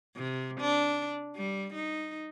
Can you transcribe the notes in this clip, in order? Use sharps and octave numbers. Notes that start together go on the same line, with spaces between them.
C3
D4
G3
D#4